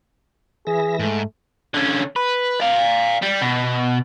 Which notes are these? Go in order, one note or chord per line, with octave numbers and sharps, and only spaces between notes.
E3 G#4 E5 A#6
G#2 A3
D3 C#4
B4
D5 F5
G3
B2